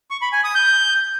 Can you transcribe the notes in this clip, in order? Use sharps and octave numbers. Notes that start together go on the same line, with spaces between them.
C#6
B5
G#5
D#6
G6